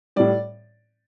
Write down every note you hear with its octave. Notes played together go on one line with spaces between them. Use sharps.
A2 G3 D5